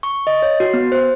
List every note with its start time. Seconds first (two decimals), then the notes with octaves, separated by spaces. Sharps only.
0.03 C#6
0.27 D#5
0.42 C#5
0.60 F#4
0.74 B3
0.92 C5